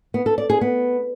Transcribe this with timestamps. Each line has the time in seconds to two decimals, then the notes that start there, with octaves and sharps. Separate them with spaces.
0.14 B3
0.26 A4
0.38 D5
0.50 G#4
0.61 B3